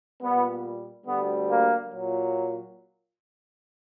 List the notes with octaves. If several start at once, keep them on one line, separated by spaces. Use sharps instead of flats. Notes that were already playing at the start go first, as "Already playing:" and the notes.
A#2 G3 B3
D2 D3 G3 B3
A#3
A#2 F#3